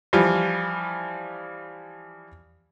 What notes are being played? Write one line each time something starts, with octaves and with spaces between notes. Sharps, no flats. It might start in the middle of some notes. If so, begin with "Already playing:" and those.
E3 F3 G3